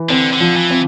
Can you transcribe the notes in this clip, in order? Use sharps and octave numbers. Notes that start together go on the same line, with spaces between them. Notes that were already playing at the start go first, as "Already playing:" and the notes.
Already playing: E3
D3 C4
D3
F3
E3
C4